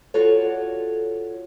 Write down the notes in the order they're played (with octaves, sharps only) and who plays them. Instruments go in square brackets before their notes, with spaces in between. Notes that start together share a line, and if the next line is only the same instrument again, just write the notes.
[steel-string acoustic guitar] F4 F#4 A4 C#5 D5